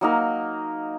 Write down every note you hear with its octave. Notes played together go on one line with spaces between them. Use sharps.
F#3 A#3 D#4 A#4